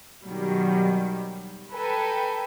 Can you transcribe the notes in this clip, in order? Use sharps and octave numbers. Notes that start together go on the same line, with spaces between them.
B2 D#3 F#3 G3
A4 B4 G5 G#5 A#5